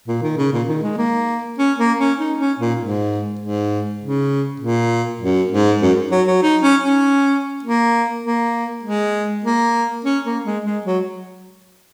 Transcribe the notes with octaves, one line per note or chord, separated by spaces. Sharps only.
A#2
D#3
C#3
A#2
D#3
G#3
A#3
C#4
A#3
C#4
D#4
C#4
A#2
G#2
G#2
C#3
A#2
F#2
G#2
F#2
F#3
F#3
D#4
C#4
C#4
A#3
A#3
G#3
A#3
C#4
A#3
G#3
G#3
F#3